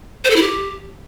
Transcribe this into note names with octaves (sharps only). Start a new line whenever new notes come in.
C5
A4
E4
G4